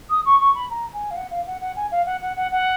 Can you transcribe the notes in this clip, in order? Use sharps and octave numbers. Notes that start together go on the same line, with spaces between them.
D#6
C#6
C#6
B5
A#5
G#5
F5
F#5
F5
F#5
F#5
G#5
F5
F#5
F#5
F#5
F#5